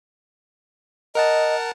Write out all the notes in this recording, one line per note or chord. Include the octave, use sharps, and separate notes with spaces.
A#4 D#5 F#5 A5